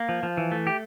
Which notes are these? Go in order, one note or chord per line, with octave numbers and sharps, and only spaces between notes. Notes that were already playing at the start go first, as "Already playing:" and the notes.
Already playing: A#3
F3
F3
E3
A3
G4